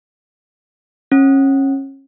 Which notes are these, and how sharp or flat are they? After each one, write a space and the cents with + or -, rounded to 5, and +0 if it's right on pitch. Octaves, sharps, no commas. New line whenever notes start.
C#4 -30